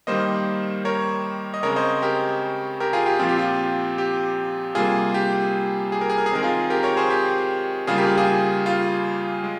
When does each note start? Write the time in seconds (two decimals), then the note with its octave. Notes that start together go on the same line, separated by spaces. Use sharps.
0.07 D#3 G3 A#3 C5 D#5
0.85 A#4 C#5
1.54 D#5
1.63 C#3 G#3 C4 A#4 C#5
1.76 C5 D#5
2.02 G4 A#4
2.80 G4 A#4
2.93 F4 G#4
3.06 G4
3.19 A#2 F3 C4 F4
3.29 G4
3.38 F4
3.98 G4
4.75 C3 G3 A#3 F4 G#4
5.14 G4
5.92 G#4
6.01 A#4
6.10 G#4
6.18 A#4
6.26 G#4
6.32 D#3 G#3 C4 A#4
6.43 F4 G#4
6.70 G4 A#4
6.83 A#4 C#5
6.97 G#4 C5
7.10 G4
7.87 C#3 G3 A#3 F4 G#4
7.98 G4 A#4
8.07 F4 G#4
8.17 F4 G#4
8.66 F4
9.44 G#3